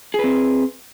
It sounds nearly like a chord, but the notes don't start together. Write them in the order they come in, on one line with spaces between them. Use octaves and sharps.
G#4 B4 C4